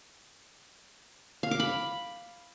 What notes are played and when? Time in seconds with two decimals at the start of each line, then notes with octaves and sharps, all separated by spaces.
1.43 F5
1.51 D6
1.60 B5